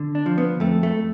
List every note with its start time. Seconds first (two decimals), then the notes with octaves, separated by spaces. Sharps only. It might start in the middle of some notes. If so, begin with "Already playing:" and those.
Already playing: D3
0.15 D4
0.26 F3
0.38 B3
0.60 F2 A3
0.83 A3